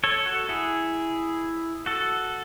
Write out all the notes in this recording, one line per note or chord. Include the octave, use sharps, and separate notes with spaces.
A4 C#5
F#4 A4
E4 G#4
F#4 A4